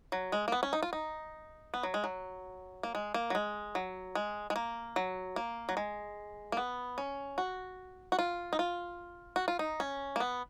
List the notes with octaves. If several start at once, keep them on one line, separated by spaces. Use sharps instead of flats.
F#3
G#3
A#3
B3
C#4
D#4
F4
D#4
B3
F#3
G#3
F#3
A#3
G#3
A#3
F#3
G#3
F#3
G#3
G#3
A#3
F#3
A#3
F#3
G#3
A#3
B3
C#4
F#4
F#4
F4
D#4
F4
F#4
F4
D#4
C#4
A#3
B3